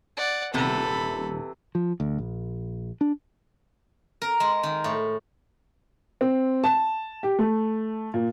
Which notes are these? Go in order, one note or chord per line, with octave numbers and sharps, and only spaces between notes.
D5 F#5
D#1 C3 E3 B3 A4 B5
F3
D2
A#1
D4
A#4
G#3
D#3
A2
C4
A5
G4
A3
A#2